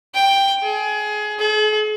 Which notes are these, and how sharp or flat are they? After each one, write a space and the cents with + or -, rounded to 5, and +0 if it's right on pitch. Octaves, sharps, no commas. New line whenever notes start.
G5 +5
G#4 +25
G#4 +45